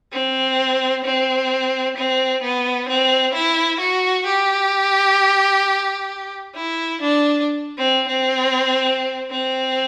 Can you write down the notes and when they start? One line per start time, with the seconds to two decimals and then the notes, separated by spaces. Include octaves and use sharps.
0.13 C4
1.05 C4
1.97 C4
2.42 B3
2.88 C4
3.34 E4
3.80 F#4
4.26 G4
6.55 E4
7.01 D4
7.78 C4
8.08 C4
9.31 C4